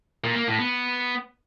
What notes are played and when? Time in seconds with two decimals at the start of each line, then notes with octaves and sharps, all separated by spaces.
0.24 A#2
0.36 A#3
0.47 A2
0.59 B3